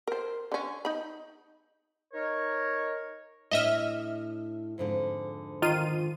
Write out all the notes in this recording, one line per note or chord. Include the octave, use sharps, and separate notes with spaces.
A#4 C5
D3 C#4
D#4 B5
D#4 A#4 C#5
A2 D4 C#5 D#5 E5 F6
F2 G#2 D3
D#3 F4 D#7